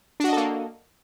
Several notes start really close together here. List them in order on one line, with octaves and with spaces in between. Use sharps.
D4 F#4 D#5 A4 A#3